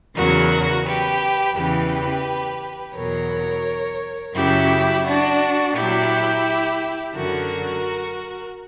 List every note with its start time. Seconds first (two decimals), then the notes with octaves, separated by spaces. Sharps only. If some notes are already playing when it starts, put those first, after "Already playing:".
0.16 E2 C#3 F#3 F#4 A#4
0.86 G4 B4
1.56 E2 C#3 E3 G4 B4
2.96 E2 B2 F#3 A#4 C#5
4.36 F#2 C#3 F#3 E4 G4
5.06 D4 F#4
5.76 A#2 F#3 E4 G4
7.16 F#2 D3 F#3 F#4 A#4